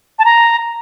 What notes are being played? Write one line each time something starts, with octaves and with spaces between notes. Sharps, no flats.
A5
A#5